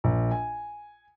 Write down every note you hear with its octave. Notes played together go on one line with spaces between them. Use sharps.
A#1
G#5